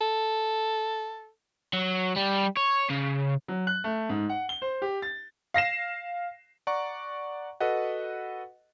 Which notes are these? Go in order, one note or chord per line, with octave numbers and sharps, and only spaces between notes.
A4
F#3
G3
C#5
C#3
F#3
F#6
A3
G#2
F#5
G7
C5
G4
A6
F5 A#6 C7 E7
D5 F#5 A#5 C#6
F#4 A4 B4 D#5 F#5